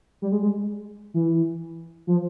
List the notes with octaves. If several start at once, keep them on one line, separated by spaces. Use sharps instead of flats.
G3
G#3
G#3
E3
F3